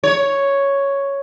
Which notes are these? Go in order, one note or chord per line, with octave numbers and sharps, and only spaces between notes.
C#5